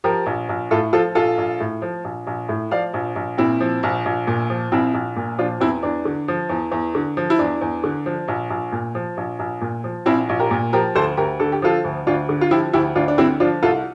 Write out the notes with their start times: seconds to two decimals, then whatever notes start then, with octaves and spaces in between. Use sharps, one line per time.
0.04 F3 G4 A#4
0.26 A#1
0.49 A#1
0.71 A2 F4 A4
0.93 F3 F4 A4
1.15 A#1 F4 A4
1.38 A#1
1.60 A2
1.82 F3
2.04 A#1
2.27 A#1
2.49 A2
2.71 F3 D5 F5
2.94 A#1
3.16 A#1
3.38 A#2 C4 E4
3.60 F3
3.83 A#1
4.05 A#1
4.27 A#2
4.50 F3
4.72 A#1 C4 E4
4.94 A#1
5.16 A#2
5.38 F3 D4 F4
5.61 E2 C4 E4
5.83 E2 D4
6.05 D3
6.28 F3
6.50 E2
6.72 E2
6.95 D3
7.17 F3
7.30 E4
7.39 E2 D4
7.61 E2
7.84 D3
8.06 F3
8.28 A#1
8.50 A#1
8.72 A#2
8.95 F3
9.17 A#1
9.39 A#1
9.61 A#2
9.84 F3
10.06 A#1 C4 E4
10.29 A#1
10.39 G4 A#4
10.51 A#2
10.73 F3 G4 A#4
10.95 D2 A4 C5
11.17 D2 G4 A#4
11.40 D3 A4
11.52 G4
11.62 F3 F4 A4
11.84 D2
12.07 D2 D4 F4
12.29 D3
12.41 F4
12.51 F3 E4 G4
12.73 D2 E4 G4
12.95 D2 D4 F4
13.08 D4
13.18 D3 C4 E4
13.40 F3 D4 F4
13.63 C2 F4 A4